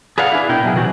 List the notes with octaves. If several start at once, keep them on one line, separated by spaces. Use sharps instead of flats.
G#4 B4 D5 F5 F#5
D4 E4
B2 E4 A#4 G5
B2 F#3 G#4
C3 E3 F#3 F#4 G4